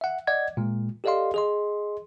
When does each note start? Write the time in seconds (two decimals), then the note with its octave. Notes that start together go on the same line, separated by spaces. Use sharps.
0.01 E5 F#5
0.27 D5 D#5 F#5 G#6
0.57 A#2 G#3
1.04 G4 A4 D5 D#5 F5 C6
1.34 G#4 D#5 C6